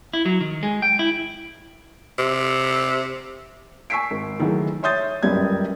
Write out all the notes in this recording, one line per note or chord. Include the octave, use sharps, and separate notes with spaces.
E4
F#3
D#3
G#3
G5
E4
C3
G#5 C#6 E6 B6 C7 D7
G#1
D#3 E3 F#3 G#3 A3
C#5 E5 C6 D#6 G6 A6
G1 C#2 F#2 G3 G#6